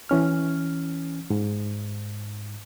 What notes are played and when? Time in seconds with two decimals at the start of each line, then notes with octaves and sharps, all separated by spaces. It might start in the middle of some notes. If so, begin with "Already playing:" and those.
0.09 E3 C#4 F6
1.30 G#2